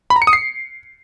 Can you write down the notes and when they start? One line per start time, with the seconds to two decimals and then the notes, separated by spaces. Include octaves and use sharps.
0.10 B5
0.16 A#5
0.22 C#7
0.27 D#6
0.33 C7